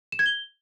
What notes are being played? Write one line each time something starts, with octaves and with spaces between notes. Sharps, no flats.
E7
G#6
G7